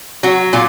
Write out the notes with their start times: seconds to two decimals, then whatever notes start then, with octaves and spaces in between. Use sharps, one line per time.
0.23 F#3 F#4
0.53 A#2 F4